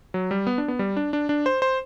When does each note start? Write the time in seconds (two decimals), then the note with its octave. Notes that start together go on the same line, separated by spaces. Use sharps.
0.14 F#3
0.31 G3
0.47 B3
0.58 D4
0.68 B3
0.79 G3
0.97 D4
1.13 D4
1.29 D4
1.46 C5
1.62 C5